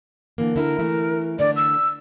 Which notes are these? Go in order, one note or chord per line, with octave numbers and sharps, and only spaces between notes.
D3 E3 A#3
D3 E4 A#4
E3 A3 E4
D3 A3 D5
E6